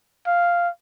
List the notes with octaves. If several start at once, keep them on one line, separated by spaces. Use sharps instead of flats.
F5